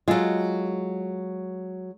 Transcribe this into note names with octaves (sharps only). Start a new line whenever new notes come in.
F#3 G#3 F4 A4